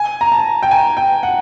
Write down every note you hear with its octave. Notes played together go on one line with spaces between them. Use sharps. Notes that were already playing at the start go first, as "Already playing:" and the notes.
Already playing: G#5
A#5
A5
G5
G#5
G5
F#5